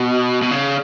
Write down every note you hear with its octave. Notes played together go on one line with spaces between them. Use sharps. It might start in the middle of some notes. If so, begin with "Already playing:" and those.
Already playing: B2
B2
C#3